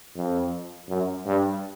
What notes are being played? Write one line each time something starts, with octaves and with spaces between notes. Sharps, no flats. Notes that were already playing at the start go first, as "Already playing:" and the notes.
F2
F#2
G2